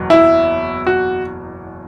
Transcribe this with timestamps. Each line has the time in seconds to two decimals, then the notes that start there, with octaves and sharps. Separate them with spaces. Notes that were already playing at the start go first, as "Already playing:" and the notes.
Already playing: F#1 E2 B2 F#3
0.10 E4
0.87 F#4